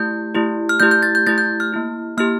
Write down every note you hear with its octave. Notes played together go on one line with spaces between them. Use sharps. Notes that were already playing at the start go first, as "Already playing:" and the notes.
Already playing: A3 E4 G4 G6
A3 E4 G4
F6
A3 E4 G4 G6
G6
A6
G6
A3 E4 G4 A6
G6
F6
A#3 E4 G4
A#3 E4 G4 F6